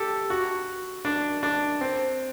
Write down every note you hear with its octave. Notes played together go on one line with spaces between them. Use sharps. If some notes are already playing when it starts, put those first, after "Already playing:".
Already playing: G4 A4
F#4
D4
D4
C4